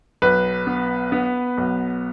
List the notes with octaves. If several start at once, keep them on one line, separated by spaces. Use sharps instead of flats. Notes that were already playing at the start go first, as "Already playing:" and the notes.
B1 B4
B3
B3
B1